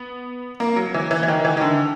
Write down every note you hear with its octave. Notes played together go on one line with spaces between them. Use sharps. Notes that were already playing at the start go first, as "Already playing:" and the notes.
Already playing: B3
A#3
F#3
E3
E3
E3
D#3
E3
D#3
D3